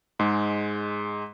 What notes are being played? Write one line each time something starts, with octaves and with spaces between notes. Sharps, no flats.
G#2 G#3